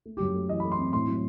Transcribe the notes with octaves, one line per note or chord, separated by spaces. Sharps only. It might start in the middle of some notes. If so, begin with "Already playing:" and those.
A3
F#2 G4
A3
E3 D#5
A3 B5
C6
C4
A2 C6
F#3